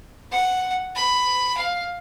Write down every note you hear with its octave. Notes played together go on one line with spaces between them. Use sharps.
F#5
B5
F5